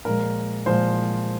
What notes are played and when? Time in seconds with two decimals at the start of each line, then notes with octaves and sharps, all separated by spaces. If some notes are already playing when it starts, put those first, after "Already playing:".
0.05 A#2 F3 G#3 A#4
0.66 A#2 F3 G#3 C5